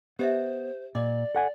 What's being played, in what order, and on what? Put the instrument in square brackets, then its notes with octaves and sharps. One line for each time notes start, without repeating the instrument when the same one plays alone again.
[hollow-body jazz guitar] B3 [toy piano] G4 D#5 E5 [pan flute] C5
[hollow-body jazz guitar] A#2 [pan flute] D5 [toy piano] D#5 D6
[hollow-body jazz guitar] A4 F#5 G#5